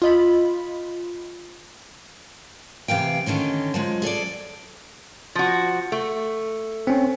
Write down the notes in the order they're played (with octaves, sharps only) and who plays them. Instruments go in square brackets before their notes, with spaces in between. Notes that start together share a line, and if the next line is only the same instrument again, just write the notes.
[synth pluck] F4 D#5 B5
[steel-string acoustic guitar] C3 E3 F5 G5
D3 D#3 C#4 D#4
F3 F#3 G#3
G#4 A4 C#5 D5
[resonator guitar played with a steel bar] F3 F#4
A3
[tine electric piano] C4 C#4